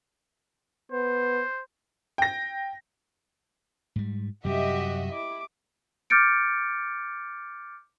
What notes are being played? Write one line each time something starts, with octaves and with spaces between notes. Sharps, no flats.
B3 C5
G5 A#6
G#2 G3
F#2 C3 G3 F#4 G4 D#5 E5
E4 D6
D6 F6 G6 A6 C#7 D7